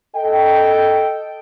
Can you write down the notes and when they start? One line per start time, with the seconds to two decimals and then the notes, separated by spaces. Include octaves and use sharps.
0.16 A4 D#5 G5